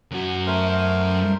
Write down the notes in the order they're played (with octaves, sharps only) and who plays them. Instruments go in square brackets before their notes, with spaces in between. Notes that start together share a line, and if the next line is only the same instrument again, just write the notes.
[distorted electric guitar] F#2 F#4
[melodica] A3 A#4 C5